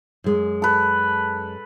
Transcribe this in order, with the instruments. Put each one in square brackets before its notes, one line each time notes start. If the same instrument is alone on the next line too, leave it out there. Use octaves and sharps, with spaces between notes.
[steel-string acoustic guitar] F#2 G#3
[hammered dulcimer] A4 B4